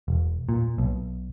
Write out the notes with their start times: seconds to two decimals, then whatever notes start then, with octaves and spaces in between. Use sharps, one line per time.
0.08 E1
0.49 A#2
0.78 B1